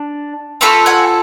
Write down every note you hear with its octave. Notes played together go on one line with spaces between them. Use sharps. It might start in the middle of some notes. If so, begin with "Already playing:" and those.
Already playing: D4
C4 F4 A4 B5 C#6
F#5 G#5